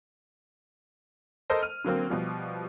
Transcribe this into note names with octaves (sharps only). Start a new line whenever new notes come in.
A4 A#4 C5 D#5
F6 D#7
D3 F#3 A#3 C4
B2 F3 G3